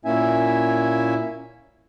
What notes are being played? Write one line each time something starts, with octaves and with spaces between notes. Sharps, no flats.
A#2 A#3 C#4 E4 E5 G#5